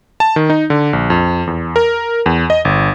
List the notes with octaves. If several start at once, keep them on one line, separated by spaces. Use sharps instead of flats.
A5
D#3
D#4
D3
A#1
F2
E2
A#4
E2
D#5
G1